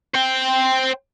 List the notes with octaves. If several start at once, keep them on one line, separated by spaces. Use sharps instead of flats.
C5 G5